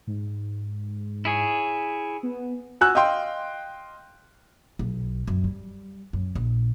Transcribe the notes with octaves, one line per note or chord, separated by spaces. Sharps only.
G#2
E4 G#4 C#5
B3
F#4 G#5 E6 F#6
D#5 F5 G5 C6
B1
F#2
G3
F#2
A#1